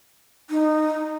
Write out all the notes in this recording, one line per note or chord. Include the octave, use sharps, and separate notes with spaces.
D#4